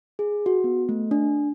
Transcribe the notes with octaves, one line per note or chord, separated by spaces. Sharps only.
G#4
F#4
B3
A3
D4